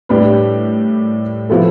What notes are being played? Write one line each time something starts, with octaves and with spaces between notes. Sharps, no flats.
A2 G3 D4 G4 B4
C3 F3 B3 E4 A4